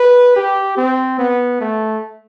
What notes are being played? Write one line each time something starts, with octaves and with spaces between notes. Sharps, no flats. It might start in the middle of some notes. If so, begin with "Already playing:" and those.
Already playing: B4
G4
C4
B3
A3